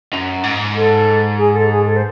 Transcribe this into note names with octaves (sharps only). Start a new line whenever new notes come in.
F#2
G#2
A4
G#4
A4
G#4
A4
C5